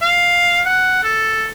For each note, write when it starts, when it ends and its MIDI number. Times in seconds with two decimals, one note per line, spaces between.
0.02 0.60 77
0.66 1.01 78
1.03 1.48 69